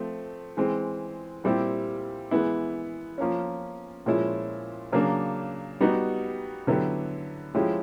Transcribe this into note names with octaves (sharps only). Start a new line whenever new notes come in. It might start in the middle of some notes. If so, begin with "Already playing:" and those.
Already playing: F3 A3 C4
E3 G#3 C4
A#2 G3 C4 E4 G4
E3 G#3 B3 E4
F3 A#3 C#4
A#2 F3 G#3 C#4 E4
C#3 F#3 A#3 D4
G3 B3 D#4 F#4
D3 F#3 B3 E4 G4
F3 G#3 C#4 E4 G4